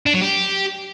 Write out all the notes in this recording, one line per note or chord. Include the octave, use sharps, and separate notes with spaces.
D4
F#3
G4